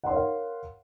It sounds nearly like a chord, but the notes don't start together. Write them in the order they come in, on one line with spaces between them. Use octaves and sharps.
F#5 C6 C#5 A#4 F5